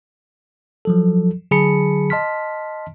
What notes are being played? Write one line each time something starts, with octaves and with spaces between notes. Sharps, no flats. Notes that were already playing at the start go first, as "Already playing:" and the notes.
F3 F#3 A4
D3 F#3 G#4 A5 B5 C#7
D#5 A5 C6 F6 B6